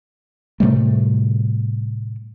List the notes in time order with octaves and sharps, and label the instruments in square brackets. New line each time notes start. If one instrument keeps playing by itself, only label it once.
[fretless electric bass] A2 C3 G3 A3